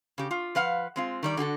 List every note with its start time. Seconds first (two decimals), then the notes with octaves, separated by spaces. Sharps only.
0.18 C#3 G4
0.31 F4
0.55 F3 B4 F5 F#5
0.96 G#3 C4 F4
1.23 D#3 G3 D5
1.37 D3 F#4 G#4 A4